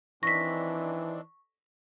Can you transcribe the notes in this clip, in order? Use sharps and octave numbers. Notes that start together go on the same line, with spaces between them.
D#3 E3 C4 D4 C#6 A#6 B6